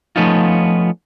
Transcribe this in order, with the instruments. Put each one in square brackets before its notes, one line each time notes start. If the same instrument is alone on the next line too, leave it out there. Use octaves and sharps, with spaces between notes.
[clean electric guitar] F3 A3 B3 C#4 D#4 F4